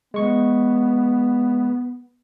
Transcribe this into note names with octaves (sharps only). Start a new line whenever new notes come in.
G#3 B3 C#6